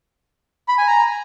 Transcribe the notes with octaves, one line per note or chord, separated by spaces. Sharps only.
B5
G#5
A#5